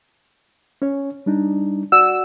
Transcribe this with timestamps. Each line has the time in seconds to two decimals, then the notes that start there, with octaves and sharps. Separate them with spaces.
0.82 C#4 C#5
1.26 G3 D4 D#4
1.92 F#4 D5 F#5 E6